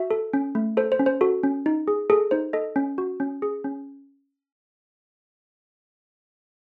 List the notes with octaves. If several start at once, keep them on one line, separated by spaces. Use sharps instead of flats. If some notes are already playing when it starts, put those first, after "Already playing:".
Already playing: F#4 E5
A4
C#4
A3
A4 C5
C5
C#4
C5
F#4 A4
C#4
D#4
G#4
G#4 A4
D#4 C5
A4 D#5
C#4
F#4
C#4
G#4
C#4